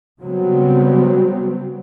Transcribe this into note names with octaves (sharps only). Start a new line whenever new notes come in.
C#3 F#3 G3 B3 C4